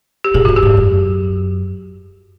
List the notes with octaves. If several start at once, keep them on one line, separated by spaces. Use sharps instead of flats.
G4
A#2 G#4
A2 F#4
G4
G#2
F#2